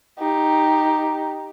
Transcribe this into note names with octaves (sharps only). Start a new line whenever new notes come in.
D#4 G4